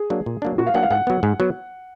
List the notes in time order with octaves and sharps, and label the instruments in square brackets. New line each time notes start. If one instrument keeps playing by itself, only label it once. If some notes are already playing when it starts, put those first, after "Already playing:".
Already playing: [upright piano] G#4
[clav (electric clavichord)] F#3 A#3 D4
A#2
F#3 A#3 D4
[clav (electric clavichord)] A#2 [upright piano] F#4
[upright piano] F5
[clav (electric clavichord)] F#3 A#3 D4 [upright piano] F#5
[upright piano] F5
[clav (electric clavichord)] G#2 [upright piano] F#5
[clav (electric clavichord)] F#3 B3
G#2
F#3 B3